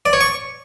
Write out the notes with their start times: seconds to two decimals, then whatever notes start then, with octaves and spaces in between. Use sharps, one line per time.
0.06 D5
0.13 C#5
0.21 C#6